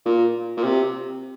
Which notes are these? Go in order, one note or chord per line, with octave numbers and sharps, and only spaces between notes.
A#2
A#2
C3